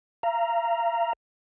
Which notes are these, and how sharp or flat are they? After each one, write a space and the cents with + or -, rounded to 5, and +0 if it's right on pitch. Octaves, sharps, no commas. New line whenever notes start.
F5 -40 A#5 +0